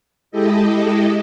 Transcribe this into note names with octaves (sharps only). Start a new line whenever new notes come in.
G#3 E4 G4 A4 D#5